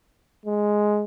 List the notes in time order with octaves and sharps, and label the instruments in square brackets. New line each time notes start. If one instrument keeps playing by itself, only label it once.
[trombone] G#3